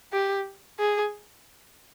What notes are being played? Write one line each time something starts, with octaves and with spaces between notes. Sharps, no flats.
G4
G#4